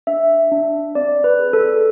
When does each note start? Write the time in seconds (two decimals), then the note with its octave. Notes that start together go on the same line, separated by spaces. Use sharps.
0.07 D4 E5
0.51 D4
0.95 C4 D5
1.24 B4
1.39 G#4
1.53 A4